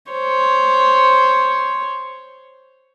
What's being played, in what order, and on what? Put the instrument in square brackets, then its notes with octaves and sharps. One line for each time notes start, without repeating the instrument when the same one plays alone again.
[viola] C5 C#5